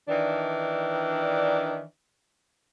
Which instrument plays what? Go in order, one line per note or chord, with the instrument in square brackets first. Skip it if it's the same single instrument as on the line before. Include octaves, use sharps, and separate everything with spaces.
[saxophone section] D#3 E3 D4